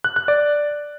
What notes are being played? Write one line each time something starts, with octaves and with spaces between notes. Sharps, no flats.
F#6
F#6
D5